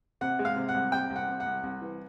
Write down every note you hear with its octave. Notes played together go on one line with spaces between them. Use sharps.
C3 F#5
G#3
F5
C3
F#5
C2
C3 G5
C2
F#5
C3
F#5
C2
C2
E3